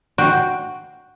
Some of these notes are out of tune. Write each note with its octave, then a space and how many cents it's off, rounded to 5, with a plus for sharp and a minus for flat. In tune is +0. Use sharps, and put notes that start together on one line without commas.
F#4 +0 G5 +0